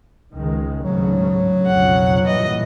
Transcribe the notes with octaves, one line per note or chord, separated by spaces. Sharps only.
C#2 D#3 G#3
D2 G#2 C#3 F#3
B1 F2 C#3 F#5
G2 A#2 E3 D#5